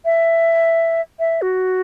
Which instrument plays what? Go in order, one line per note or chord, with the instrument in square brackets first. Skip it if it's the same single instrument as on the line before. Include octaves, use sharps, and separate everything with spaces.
[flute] E5
E5
F#4